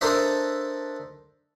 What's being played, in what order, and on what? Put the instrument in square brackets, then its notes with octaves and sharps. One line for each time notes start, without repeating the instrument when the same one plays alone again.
[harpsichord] D4 A4 A#4 C5 D#5 E5